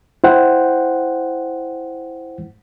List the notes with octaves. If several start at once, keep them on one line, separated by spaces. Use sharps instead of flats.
E4 C5 F#5 G5